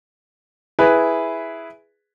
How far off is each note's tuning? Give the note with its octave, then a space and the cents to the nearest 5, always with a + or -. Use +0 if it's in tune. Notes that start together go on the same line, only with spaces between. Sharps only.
E4 +0 G#4 +0 B4 +0